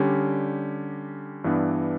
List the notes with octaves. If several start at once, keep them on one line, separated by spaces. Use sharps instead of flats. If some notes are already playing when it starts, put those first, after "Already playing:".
Already playing: D3 G3 C#4 G4
G2 E3 B3 D4